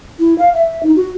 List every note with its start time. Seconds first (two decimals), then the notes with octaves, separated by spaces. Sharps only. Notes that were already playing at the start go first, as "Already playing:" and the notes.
0.20 E4
0.38 F5
0.54 E5
0.83 D#4
0.96 F#4